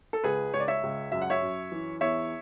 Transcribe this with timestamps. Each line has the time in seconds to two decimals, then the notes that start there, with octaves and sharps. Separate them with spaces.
0.13 A4
0.24 C#2 G#4 B4
0.54 C#2 C#5
0.60 D5
0.68 C#5 E5
0.83 C#2
1.12 F#2 E5
1.21 F#5
1.30 C#5 E5
1.42 F#2
1.72 E3
2.01 E2 C#5 E5